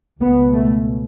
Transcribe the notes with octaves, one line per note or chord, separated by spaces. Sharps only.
C#2 B2 B3
A3